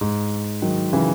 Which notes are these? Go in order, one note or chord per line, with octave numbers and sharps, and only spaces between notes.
G#2
D#3 F#3
C#3 E3